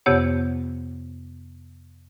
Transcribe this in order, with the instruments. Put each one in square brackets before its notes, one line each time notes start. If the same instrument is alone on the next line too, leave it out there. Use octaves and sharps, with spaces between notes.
[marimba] F2 C3 B3 G4 C#5 F#5